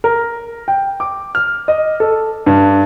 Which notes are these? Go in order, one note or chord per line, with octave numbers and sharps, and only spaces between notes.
A#4
G5
D6
F6
D#5
A4
G2